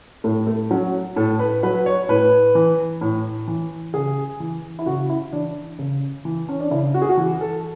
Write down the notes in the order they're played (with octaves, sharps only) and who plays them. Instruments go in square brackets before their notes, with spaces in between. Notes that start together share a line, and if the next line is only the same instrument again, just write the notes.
[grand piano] A2 A3
A3
F#3 C#4
A2 A4
B4
F#3 B4
C#5
A2 B4
E3
A2
E3
C#3 G#4
E3
E4
C#3 F#4
E4
E3 D4
C#3
E3
C#4
D4
C#3 E4
F#4
G#4
F#4
E3
A4